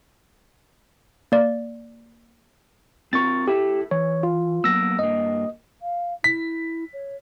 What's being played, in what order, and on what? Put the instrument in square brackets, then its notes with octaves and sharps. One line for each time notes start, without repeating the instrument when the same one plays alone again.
[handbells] A#3 D5
[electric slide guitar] C4 F4 A#4 [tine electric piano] C#6 A6
[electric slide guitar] E4 A4 E5 [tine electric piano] G4
[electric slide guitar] E3 [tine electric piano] C#5
[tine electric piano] F4
[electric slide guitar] F#3 A#3 B3 [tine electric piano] E6 A#6
[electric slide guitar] G2 A#3 [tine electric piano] D#5
[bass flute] F5
[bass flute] E4 [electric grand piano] B6
[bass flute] C#5